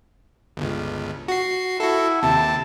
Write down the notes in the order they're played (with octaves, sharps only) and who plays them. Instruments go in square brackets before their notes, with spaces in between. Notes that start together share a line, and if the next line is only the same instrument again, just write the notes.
[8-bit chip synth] G1 C#2
F#4 C7
[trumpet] E4 [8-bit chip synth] F#4 A4
[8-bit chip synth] D#2 C3 [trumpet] A5